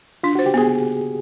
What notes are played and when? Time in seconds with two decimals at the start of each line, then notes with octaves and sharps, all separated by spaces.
0.23 D4 F4
0.35 F#4
0.39 C5
0.46 G4
0.54 B3 G#4